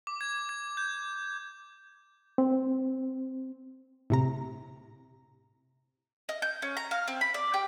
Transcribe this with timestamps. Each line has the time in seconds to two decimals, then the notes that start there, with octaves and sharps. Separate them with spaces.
0.07 D6
0.21 G#6
0.49 G#6
0.77 G6
2.38 C4
4.10 A2 C3 A#5
6.29 D#5
6.42 G6
6.62 C#4
6.77 A#5
6.91 F5
7.08 C4
7.21 B5
7.34 D5
7.54 G4